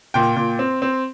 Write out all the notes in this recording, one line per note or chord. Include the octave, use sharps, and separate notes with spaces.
A#2 G5
A#2
C4
C4